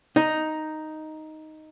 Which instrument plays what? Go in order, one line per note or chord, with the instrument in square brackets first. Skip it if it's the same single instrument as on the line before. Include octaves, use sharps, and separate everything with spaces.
[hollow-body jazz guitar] D#4